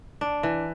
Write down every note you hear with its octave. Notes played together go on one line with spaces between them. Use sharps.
D4
E3